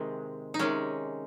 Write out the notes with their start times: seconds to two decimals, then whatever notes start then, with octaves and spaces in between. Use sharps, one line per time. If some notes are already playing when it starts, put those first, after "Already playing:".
Already playing: C3 D#3 G#3 C4
0.54 D#4
0.59 C3 D#3 G#3 C#4